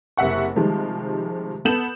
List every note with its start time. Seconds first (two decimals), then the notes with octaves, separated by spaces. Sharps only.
0.17 F#1 C3 E5 F#5 C#6
0.56 C3 D#3 F3 G3 G#3
1.65 B3 A4 G6 E7 F#7